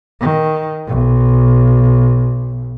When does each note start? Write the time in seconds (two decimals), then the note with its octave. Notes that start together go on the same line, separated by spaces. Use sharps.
0.20 D#3
0.87 B1